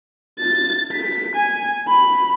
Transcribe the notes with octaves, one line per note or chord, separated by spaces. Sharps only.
A6
B6
G#5
B5